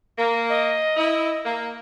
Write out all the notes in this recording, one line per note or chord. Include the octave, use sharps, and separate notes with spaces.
A#3
D#5
E4
A#3